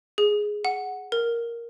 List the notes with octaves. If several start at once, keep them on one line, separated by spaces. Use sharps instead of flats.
G#4
F#5
A#4